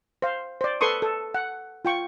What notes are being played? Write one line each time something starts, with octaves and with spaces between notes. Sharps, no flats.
C5 F5
C5 D5
A4 B4 C6 C#6 D#6
A4
F#5
F4 G5 C#6